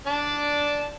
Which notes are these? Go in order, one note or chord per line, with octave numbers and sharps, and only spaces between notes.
D4 D5 A5